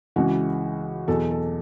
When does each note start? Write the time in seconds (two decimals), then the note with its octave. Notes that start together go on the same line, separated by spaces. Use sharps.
0.16 C#2 C#3 E3 F#4
1.08 E2 B2 F#3 A4
1.31 A4